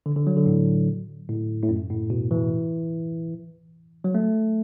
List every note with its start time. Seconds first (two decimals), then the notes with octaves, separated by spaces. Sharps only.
0.06 D3
0.16 D3
0.27 F#3
0.36 D3
0.46 A2
1.29 A2
1.63 A2
1.69 F#2
1.90 A2
2.10 B2
2.31 E3
4.04 F#3
4.15 A3